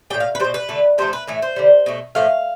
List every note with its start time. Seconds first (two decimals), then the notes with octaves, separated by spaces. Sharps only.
0.10 G3 G5
0.14 A2
0.20 F5
0.35 B4
0.40 B2 G3 C5
0.54 B4
0.69 D3 A3
0.98 C3 F3 A3 C5
1.13 B4
1.27 A2 E3 A3
1.42 C5
1.56 D3 G3
1.86 B2 A3
2.15 A2 F3 A3 F5